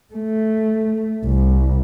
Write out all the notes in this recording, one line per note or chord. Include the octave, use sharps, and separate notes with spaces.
A3
C2